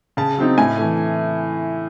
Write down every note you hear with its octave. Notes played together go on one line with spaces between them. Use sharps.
C#3 A5
F#3 C4 D#4
A2 G#5
E3 A3